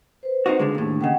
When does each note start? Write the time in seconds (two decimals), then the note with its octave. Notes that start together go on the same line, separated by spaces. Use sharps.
0.23 B4 C5
0.46 C4 D#4 F#4
0.59 C#2 D3 G#3
0.75 D#2 A2 A#3 D4
1.01 D#2 C#3 D#5 F#5 G5